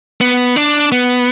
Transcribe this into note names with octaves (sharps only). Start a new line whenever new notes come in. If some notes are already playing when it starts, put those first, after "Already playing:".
B3
D4
B3